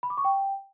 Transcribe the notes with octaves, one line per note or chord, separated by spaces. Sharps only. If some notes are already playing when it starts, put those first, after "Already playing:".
B5
D6
C#6
G5